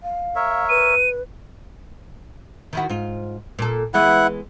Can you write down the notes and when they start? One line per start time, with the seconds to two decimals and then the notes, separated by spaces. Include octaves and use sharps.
0.03 F5
0.36 A#4 C#5 E5
0.69 B4 D#7
2.73 D#3 E4 F#4
2.89 G#2 F4
3.59 A#2 A4
3.94 E3 G#3 B3 E4 F#5